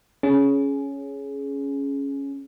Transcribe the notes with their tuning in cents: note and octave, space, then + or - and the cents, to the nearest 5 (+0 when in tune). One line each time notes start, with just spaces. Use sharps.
C#4 +0 G#4 +15